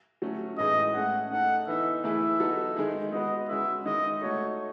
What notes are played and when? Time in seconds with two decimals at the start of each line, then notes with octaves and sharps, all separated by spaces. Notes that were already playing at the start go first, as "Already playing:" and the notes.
0.22 F#3 A3 C#4
0.58 A2 E3 G#3 D#4 G#4 D#5
0.94 A3 C#4 G#4 F#5
1.31 A3 D#4 A4 F#5
1.67 E3 B3 D#4 E5
2.03 E3 A3 E4 G#4 B4 E5
2.40 F#3 B3 D#4 A4
2.76 D#3 G#3 D#4 G#4
3.12 G#3 B3 F#4 B4 D#5
3.49 G#3 C#4 F#4 B4 E5
3.85 D#3 G#3 D#4 D#5
4.22 A3 D#4 F#4 A4 C#5